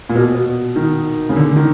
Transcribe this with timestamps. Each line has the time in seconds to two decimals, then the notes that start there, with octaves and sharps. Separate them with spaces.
0.09 A#2
0.15 B2
0.35 B2
0.76 D#3
1.29 C#3
1.36 D3
1.51 D3
1.56 D#3